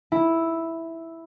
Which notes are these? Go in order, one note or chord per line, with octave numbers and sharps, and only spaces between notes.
E4